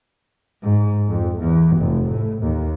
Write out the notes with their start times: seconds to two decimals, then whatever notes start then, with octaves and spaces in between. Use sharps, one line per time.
0.62 G#2
1.09 F2
1.39 E2
1.77 F1
2.09 A2
2.43 D#2